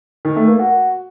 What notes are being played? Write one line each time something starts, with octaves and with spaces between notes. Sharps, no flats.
D#3
A3
A#3
F#4